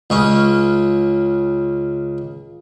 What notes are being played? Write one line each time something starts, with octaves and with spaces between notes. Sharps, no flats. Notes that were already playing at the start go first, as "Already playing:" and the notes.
C#2 C#4